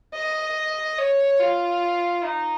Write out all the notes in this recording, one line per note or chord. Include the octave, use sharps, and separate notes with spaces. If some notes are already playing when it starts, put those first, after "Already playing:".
D#5
C#5
F4
D#4